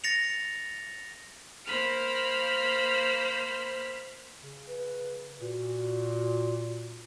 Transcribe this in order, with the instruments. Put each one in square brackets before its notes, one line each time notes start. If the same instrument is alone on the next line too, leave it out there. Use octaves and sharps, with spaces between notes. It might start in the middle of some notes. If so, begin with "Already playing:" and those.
[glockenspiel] A6 A#6 C#7 F7
[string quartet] A#3 C5 B5 F6
[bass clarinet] C#3
[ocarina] B4
[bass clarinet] A#2 [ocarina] F#4